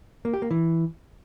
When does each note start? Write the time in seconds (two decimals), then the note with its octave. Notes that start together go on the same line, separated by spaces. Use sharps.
0.25 A#3
0.33 G4
0.42 A#3
0.51 E3